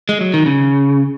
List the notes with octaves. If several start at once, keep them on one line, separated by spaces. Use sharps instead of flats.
G#3
F#3
D#3
C#3